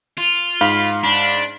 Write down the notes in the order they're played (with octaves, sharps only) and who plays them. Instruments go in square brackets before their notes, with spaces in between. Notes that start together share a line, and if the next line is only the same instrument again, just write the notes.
[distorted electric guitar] F4
[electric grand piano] G#2 F5 F6 [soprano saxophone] B5
[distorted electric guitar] D4 [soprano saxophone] B5